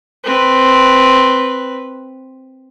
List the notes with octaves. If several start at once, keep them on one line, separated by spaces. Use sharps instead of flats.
C4 B4